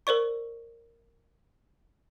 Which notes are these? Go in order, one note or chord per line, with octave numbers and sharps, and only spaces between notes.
A#4 C5 D5 C#6